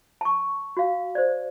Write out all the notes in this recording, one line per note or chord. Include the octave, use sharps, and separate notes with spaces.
A5 C#6
F#4 F5
C5 D5